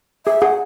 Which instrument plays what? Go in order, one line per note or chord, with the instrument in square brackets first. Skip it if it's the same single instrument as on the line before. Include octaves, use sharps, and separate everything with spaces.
[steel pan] G#4 [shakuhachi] E5
[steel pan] G#4 [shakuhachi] F#5